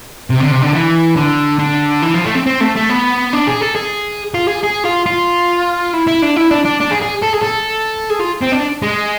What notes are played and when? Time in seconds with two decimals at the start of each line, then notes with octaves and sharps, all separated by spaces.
0.30 C3
0.40 D3
0.51 C3
0.62 D3
0.73 E3
1.16 D3
1.59 D3
2.02 E3
2.14 F3
2.25 A3
2.35 C4
2.46 C4
2.60 A3
2.76 A3
2.89 B3
3.33 D4
3.47 G#4
3.61 A4
3.76 G#4
4.34 F4
4.48 G#4
4.63 G#4
4.85 F4
5.06 F4
5.93 E4
6.07 E4
6.22 D4
6.36 E4
6.51 D4
6.65 D4
6.80 D4
6.90 G#4
7.02 G#4
7.22 A4
7.33 G#4
7.42 A4
8.10 G#4
8.20 F4
8.43 C4
8.53 D4
8.82 G#3